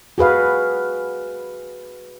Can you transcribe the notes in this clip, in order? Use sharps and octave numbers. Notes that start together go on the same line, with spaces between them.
F#4 G#4 B4 F5